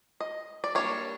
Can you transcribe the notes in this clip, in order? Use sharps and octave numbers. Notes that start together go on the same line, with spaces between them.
D#5
D5
G3 A#3 D4 C#5